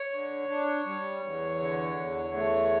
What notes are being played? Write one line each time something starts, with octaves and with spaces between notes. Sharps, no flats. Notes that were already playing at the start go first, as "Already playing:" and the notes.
Already playing: C#5
D3
D4
G3
E2
D3
E2
A3